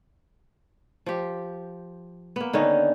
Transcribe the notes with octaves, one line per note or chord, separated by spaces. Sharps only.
F3 G4
A#3 B3
D3 D#3 C#4 D#4